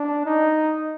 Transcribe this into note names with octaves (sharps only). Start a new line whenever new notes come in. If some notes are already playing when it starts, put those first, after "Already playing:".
Already playing: D4
D#4